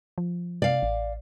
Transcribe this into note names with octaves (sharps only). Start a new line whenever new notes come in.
F3
C3 D5 F5
A1